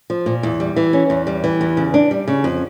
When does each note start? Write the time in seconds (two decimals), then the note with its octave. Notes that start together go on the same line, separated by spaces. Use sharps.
0.10 F3
0.26 A#2
0.43 E2
0.60 G3
0.76 E3
0.93 C#4
1.10 E2
1.27 G3
1.44 E3
1.61 E2
1.77 C#3
1.94 D4
2.11 G3
2.28 C#3
2.44 F2